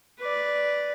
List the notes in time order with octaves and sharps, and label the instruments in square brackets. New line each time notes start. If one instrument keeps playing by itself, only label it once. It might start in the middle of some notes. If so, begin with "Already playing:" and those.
[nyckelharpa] B4 D5